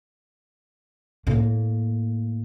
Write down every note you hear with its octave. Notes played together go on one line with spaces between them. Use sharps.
A2 A#3